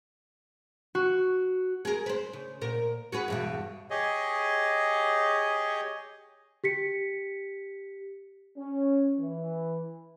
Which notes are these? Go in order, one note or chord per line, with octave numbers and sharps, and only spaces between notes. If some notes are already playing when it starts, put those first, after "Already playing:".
F#4
G#4 A#4
B4 C5
C#3
A#2 A#4
F#4 G#4 B4
E2 G2 B2
G4 G#4 C#5 D#5
G4 B6 C#7
C#4
E3